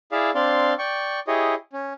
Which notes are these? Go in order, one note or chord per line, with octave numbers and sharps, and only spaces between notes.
E4 G#4 D5 E5 F5
C4 D4 D5 F5 C6
D5 G5 C#6
E4 G4 G#4 C#5 D#5
C#4